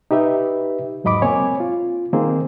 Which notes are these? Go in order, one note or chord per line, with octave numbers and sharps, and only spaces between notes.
D#4 G4 B4 E5
E2 G#2 F#3 D#5 B5 D6
A#3 C4 C#5 G#5
F4
D#3 A#3 C4 G#4